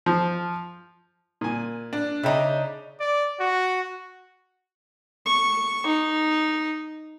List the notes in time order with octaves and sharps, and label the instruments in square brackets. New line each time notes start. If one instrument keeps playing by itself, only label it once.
[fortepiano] F3
A#2 G#5
[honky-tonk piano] D4
[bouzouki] C#3 D#4 [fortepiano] E5 G5 A#5
[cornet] D5
F#4
[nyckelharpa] C#6
D#4